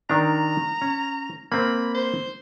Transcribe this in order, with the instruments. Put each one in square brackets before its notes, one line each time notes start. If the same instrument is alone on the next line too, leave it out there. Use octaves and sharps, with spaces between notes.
[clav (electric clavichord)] D#3 D4 [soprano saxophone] A#5
[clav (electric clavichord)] C#4
[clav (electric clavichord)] A#3 C4 [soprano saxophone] B5
[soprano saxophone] C5